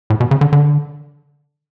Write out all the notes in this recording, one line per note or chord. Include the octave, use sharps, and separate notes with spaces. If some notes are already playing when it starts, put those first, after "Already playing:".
A2
B2
C#3
D3
D3